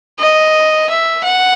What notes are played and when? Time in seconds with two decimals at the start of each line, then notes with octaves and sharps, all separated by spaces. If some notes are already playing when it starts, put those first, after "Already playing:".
0.19 D#5
0.90 E5
1.24 F#5